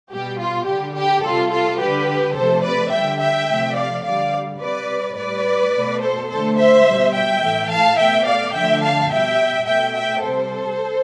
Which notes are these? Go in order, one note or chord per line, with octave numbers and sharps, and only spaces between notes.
B2 G3 G4
F4
D3 G3 G4
G4
C3 G3 F4 A4
F4 A4
D3 G3 G4 B4
C3 F3 A3 A4 C5
B4 D5
D3 G3 E5 G5
E5 G5
C3 F3 A3
D5 F5
D3 G3 D5 F5
C3 G3 B4 D5
A2 G3 B4 D5
B2 A3
A4 C5
D3 A3 A4 C5
C5 E5
B2 G3
E5 G5
A2 E3 A3
F5 A5
B2 A3 E5 G5
D5 F5
D3 F3 A3 E5 G5
F5 A5
B2 G3 E5 G5
B2 A3 E5 G5
E5 G5
C3 G3 A4 C5